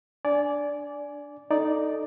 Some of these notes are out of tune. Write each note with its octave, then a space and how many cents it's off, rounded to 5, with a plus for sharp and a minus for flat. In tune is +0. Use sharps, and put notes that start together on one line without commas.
D4 -5 D5 -15 G#5 +15
D#4 +0 A4 +0 D5 +0